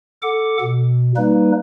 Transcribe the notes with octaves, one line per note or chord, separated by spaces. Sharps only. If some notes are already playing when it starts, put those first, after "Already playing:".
A4 F#5 D6
B2
G3 A#3 D#4 B4